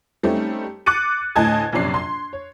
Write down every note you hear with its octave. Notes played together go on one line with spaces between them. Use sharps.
G3 A3 C4 C#4 D#4 G4
D6 F#6 A6 C#7 D#7
D2 A2 D#5 G#5 A5 G#6
A#1 F#2 C3 C#4 D5 C7
C6
C#5